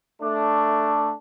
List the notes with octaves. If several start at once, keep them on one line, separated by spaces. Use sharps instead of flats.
A3 D4